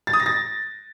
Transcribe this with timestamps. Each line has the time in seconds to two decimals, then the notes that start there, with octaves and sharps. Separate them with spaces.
0.07 A6
0.13 D#6
0.20 A#6
0.26 A6